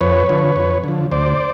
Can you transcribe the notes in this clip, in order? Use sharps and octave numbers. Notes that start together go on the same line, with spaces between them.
F2 B4 C#5
D3 F3
F2
D3 F3
D2 C5 D5